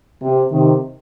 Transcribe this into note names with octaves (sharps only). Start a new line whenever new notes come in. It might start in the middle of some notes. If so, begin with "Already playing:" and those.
C3
C3 D#3